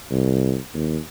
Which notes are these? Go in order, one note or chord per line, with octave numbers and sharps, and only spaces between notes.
C2
D#2